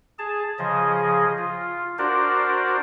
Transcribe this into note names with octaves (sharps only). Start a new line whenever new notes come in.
G#4 A5
C#3 F3 G#4 D#5
F4
D4 F#4 A#4 C5 D5